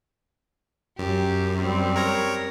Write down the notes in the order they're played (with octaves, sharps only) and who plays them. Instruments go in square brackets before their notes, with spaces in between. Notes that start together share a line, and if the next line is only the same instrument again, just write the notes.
[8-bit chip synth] F#2 [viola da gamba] G4
[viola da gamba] G3 C4
[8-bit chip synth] A#4 C#5 A#5